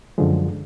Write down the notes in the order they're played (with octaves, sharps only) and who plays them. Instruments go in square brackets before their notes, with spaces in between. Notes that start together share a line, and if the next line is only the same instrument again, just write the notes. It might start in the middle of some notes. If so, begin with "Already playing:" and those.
[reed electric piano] F#2 D3 F3 G#3